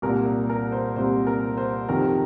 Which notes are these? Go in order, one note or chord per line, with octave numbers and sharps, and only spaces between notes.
C2 A#2 A#4
A#4
C5
C2 A#2 C5
A#4
C5
F2 C3 D#3 A#4